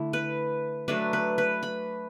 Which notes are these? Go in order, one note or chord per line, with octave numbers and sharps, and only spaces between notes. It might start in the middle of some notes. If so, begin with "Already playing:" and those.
Already playing: D3 A3 E4
B4
F#3 A3 D4 B4
B4
B4
B5